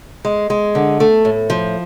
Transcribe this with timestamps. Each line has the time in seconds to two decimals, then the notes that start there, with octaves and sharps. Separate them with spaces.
0.25 G#3
0.50 G#3
0.75 D3
1.00 A3
1.25 A2
1.50 F3